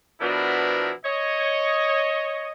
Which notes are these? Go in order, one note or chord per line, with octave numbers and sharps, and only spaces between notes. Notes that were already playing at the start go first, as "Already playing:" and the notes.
B2 F3 B3 D4 E4 A#4
C#5 D#5